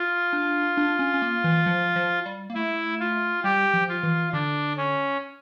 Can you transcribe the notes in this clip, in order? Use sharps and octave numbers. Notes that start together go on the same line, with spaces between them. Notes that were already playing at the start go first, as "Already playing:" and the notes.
Already playing: F4
D4
D4
C#4
C#4
A#3
E3
F3
F3
G3
A#3
A3 E4
F4
G3 G4
F3
F4
E3
D3 D4
C#4